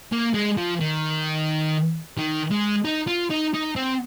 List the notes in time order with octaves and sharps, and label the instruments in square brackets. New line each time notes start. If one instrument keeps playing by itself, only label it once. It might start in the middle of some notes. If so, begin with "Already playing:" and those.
[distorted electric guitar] A#3
G#3
F3
D#3
D#3
G#3
D#4
F4
D#4
D#4
C4